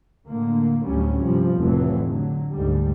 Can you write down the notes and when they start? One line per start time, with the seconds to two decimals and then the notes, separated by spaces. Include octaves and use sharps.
0.28 A2 D3 A#3
0.85 D2 A2 F#3 G3 C#4
1.24 G2 C3 F3 G3
1.57 F1 F2 A2 E3 F#3 A3
2.11 D3 F#3
2.53 D2 G#2 G3